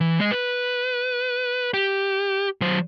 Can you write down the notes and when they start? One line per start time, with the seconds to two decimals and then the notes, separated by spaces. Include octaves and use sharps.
0.01 E3
0.19 G#3 D#5
0.31 B4
1.74 G4
2.61 F#3 C5